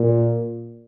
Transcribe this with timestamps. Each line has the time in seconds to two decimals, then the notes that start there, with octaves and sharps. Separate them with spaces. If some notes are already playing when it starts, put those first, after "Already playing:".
Already playing: A#2